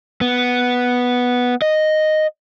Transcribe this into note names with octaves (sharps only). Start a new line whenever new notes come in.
B3
D#5